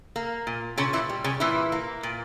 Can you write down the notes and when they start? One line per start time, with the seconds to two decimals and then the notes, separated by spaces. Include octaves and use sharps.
0.16 A#3
0.47 A#2
0.78 A#2 C#3 C#4
0.93 E3 E4
1.09 G3
1.24 C#3 C#4
1.40 A#2 E3 E4
1.72 A#3
2.03 A#2